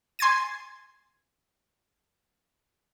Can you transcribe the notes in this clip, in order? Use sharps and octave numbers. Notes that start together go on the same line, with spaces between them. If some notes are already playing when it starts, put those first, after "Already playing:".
G#5 C6 G#6 A6 D#7